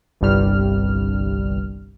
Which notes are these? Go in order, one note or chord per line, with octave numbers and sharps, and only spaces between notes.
G1 C2 G2 G3 F6